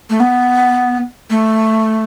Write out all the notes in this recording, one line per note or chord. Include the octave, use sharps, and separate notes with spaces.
A3
B3
A3